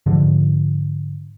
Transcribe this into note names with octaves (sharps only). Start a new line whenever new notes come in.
G#2 D3 F3